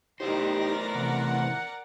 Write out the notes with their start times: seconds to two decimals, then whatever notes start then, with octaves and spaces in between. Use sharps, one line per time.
0.20 A3 D#4 E4 G4 A#4 C5 D5 A#6
0.94 C3 E3 F#5